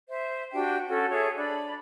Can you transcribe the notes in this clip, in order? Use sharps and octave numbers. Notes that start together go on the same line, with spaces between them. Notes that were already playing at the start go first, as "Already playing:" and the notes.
C5 E5
D4 F#4 G4 G5
C#4 F#4 A4
G#4 A4 C#5 E5
D4 D5 B5